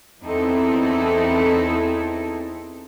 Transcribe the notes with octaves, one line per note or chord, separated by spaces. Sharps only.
E2 E3 C4 D#4 E4 A4